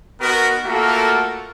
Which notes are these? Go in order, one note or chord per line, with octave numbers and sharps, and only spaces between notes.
B3 D#4 F#4 A#4
A3 A#3 F4 F#4 A4 A#4